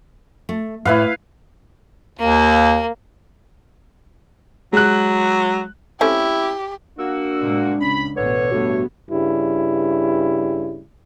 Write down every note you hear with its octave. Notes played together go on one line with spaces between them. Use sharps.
A3
A2 E4 B4 F5
D#2 A#3
F#3 G#3 F#6
A3 C4 C#4 E4 G4
A#3 D4 F#4 E6
A2 C3 G#3
C#2 C#4 B5
A1 B2 D3 B4 C#5
G2 A3 B3 F#4
G2 C#3 G3 E4